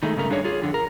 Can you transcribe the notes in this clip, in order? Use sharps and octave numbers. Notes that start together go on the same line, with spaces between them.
D#3 G#3 A3
G2 C#3 A3 A#4
G2 D4 G#4 C#5
F4 G#4
F2 D3
A#4